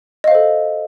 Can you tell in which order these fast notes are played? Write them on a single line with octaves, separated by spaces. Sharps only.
D#5 F5 C5 A4